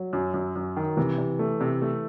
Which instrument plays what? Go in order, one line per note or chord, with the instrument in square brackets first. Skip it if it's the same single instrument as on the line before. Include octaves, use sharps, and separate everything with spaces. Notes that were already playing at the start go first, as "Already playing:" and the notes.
Already playing: [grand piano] F#3
[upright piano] F#2
F#2
F#2
D#3
[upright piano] C3 [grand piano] E3
[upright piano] C3
A3
C3
A3